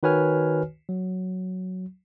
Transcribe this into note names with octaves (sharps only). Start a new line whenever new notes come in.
D#3 F#4 B4 C#5 G#5 F6
F#3